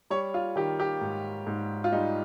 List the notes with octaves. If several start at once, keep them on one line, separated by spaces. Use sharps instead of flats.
G3 C#5
F4
D#3 G4
G4
G#2
G#2
F4
G3 D#4